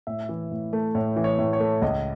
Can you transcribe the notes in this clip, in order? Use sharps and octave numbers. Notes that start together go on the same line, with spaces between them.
A2 E5
E3
A2
A3
A2 C#5
E3
C#5
A2
C#5
A3
C#2 D#5